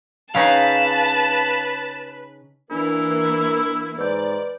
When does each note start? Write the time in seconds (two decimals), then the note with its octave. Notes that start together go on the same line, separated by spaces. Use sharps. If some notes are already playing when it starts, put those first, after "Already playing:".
0.35 C#3 C#4 D#4 B4 F5 A5
2.71 E3 A#3 D4 E4 A#4
3.99 G#2 B4 D5 G6